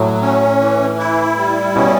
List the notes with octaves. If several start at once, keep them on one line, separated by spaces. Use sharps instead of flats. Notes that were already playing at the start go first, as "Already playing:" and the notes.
Already playing: A2 F#3
C#4
E3
E4
G3
B2 C#4